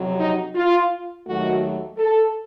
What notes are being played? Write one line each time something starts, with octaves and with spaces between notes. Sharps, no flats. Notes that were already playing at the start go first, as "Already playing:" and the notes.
Already playing: F2 C3 F#3
D#4
F4
D#2 D#3 F#3 A3 F#4
A4